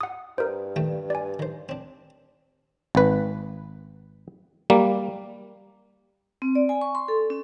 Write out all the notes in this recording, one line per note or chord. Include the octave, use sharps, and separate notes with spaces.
F#5 D#6
G2 A#4 C5
D#2 A3 G5
D5 G#5
D#3 C5
C4 D4
G#1 B4
G3 A#3
C4
D5
G#5
C#6
C6
A4
C#4